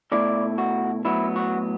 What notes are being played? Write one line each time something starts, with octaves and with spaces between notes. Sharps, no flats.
B2 A3 E4 D5
F#4
A2 F#3 B3 E4
F#4